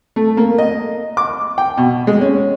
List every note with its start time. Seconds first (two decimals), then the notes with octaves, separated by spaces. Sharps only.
0.16 A3
0.37 A#3
0.58 D#5
1.17 D6
1.58 G5
1.77 B2
2.07 G#3
2.21 C#4